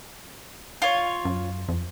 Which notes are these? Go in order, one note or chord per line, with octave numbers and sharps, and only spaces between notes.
F4 C#5
F#2
F2